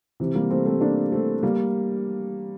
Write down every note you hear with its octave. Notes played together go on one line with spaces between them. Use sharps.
C3 E3
G3 A#3
A3 C4
A3 C4
A#3 D4
A3 C4
G3 A#3